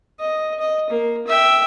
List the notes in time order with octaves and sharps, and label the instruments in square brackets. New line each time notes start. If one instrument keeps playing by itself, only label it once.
[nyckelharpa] D#5
D#5
A#3
E5 G5